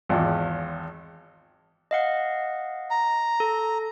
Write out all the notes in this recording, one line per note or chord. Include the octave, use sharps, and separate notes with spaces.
G#1 E2 F4
D#5 F5 F#5
A#5
A4